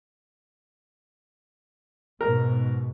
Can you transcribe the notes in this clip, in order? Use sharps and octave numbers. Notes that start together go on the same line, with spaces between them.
G#2 B2 A#4